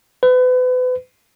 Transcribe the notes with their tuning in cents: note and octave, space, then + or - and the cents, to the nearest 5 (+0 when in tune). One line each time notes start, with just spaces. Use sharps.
B4 +35